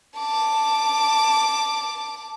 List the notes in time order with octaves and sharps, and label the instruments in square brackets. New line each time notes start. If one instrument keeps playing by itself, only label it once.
[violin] A5 D6